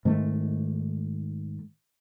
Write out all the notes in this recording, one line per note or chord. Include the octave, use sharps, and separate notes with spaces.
G#2 D#3 A3